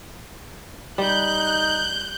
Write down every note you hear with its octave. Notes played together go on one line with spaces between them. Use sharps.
G3 D#4 F#6 G6